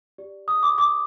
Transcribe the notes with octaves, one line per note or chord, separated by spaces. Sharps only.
G4 D5
D#6
D6
D6